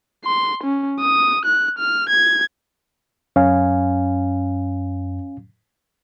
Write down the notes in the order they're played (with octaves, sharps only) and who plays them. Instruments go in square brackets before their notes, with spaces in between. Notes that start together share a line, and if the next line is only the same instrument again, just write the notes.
[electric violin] C6
C#4
D#6
F#6
F6
G#6
[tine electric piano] F#2 [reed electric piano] C#4 F5 G#5